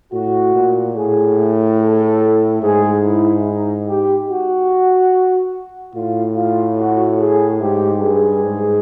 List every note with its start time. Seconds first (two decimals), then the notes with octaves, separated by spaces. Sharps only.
0.13 A2 F#4
0.55 A#2
0.96 A2 G#4
1.80 A4
2.62 G#2 G#4
3.04 E4
3.45 D#4
3.87 G4
4.29 F#4
5.94 A2 F4
6.36 F4
6.77 F#4
7.19 G#4
7.60 G#2 G4
8.02 G2 G#4
8.43 G#2